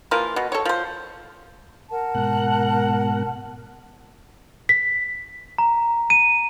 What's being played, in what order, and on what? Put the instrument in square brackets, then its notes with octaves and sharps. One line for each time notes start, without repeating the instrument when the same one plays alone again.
[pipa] E3 F3 A#3 F4
B2
A4 C#5
F3 C5
[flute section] A#4 F#5 A5
[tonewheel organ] G#2 B2 F#6
[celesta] B6
[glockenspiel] A#5
D#7